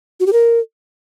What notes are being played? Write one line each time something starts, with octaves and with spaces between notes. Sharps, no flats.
F#4
G4
A#4